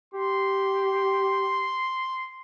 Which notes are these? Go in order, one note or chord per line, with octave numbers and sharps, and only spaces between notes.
G4 C6